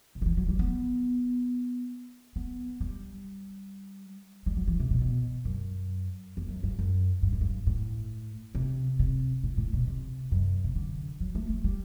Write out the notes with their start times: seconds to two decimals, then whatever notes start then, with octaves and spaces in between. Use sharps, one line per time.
0.15 C3
0.22 D3
0.26 E3
0.37 F#3
0.49 G3
0.59 B3
2.36 B3
2.81 G3
4.46 G3
4.57 F#3
4.68 E3
4.80 C3
4.91 B2
5.01 B2
5.45 F#2
6.37 E2
6.48 F#2
6.63 G2
6.79 F#2
7.22 G2
7.32 F#2
7.41 G2
7.67 A2
8.55 C3
8.99 C3
9.43 A2
9.57 A2
9.73 B2
9.87 C3
10.32 F#2
10.64 C3
10.76 D3
11.20 F#3
11.35 A3
11.49 A3
11.64 G3